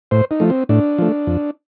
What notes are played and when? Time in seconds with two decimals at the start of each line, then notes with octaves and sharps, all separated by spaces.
0.11 A2 C5
0.31 D#4
0.40 F3 A3
0.50 C4
0.69 A2 D4
0.98 F3 A3
1.27 F2